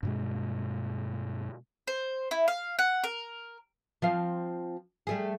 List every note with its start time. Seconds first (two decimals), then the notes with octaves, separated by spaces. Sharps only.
0.03 G2 B2 G#3
1.87 C5
2.31 E4
2.48 F5
2.79 F#5
3.04 A#4
4.02 F3 C4 F5
5.07 G3 A3 G#4